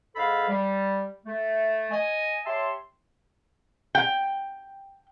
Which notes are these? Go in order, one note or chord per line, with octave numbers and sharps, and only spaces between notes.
G#2 G#4 A4 C5 F5 B5
G3
A3
D#5 G#5
G4 C#5 E5 A5 C6
G5